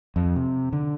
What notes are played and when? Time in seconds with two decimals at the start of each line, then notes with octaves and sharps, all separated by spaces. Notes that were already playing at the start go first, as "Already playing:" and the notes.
0.16 F2
0.36 C3
0.73 D3